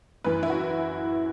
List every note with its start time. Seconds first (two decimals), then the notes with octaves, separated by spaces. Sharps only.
0.24 F#2 E3 B4
0.43 E4
0.50 F#4